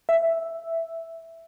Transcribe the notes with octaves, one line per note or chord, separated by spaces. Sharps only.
E5